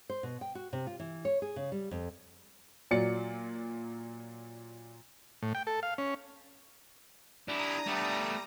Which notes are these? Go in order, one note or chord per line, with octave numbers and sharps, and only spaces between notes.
C5
B2
G5
F#4
C3
F4
E3
C#5
G#4
C#3
G3
F2
A#2 F#3 D5 C#7
A2
G5
A4
F5
C#4
D4 E4 G4 A#5 D#6
G3 A3 B3